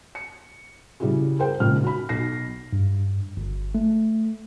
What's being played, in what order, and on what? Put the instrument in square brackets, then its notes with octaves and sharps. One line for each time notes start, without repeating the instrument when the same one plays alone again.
[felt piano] C#7
C#3 G3 C#4 E4 F#4 G#4
G#4 A#4 C5 G5
G#1 A#2 C#3 F6
F#4 B5
B1 A#6 C7
[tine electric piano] G2
G1
A3